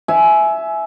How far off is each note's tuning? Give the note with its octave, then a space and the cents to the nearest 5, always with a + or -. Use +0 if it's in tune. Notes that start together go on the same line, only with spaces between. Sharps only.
E5 +0 G#5 +25